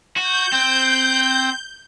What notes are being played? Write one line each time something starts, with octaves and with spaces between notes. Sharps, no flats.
F#4 G6
C4